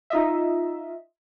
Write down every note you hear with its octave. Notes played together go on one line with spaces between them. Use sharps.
D#4 F4 D#5 E5